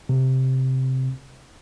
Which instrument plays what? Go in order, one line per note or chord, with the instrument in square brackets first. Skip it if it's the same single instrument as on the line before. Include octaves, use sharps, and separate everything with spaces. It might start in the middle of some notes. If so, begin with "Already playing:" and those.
[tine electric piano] C3